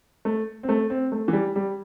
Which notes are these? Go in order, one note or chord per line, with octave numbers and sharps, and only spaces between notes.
A3
C4
A3
C4
A3
E3
G3
G3